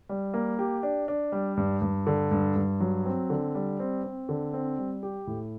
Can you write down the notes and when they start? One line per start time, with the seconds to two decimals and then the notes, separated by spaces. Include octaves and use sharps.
0.09 G3
0.34 A#3
0.59 G4
0.83 D4
1.08 D4
1.32 G3
1.57 G2
1.82 G2
2.07 D3
2.31 G2
2.56 G2
2.80 F#3
3.06 C4
3.30 D3
3.55 G3
3.80 C4
4.04 C4
4.29 D3
4.54 C4
4.78 G3
5.03 G4
5.27 A2